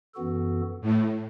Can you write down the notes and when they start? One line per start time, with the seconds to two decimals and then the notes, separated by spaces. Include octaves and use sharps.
0.14 F#2 E3 B3 F#4 A4
0.81 A2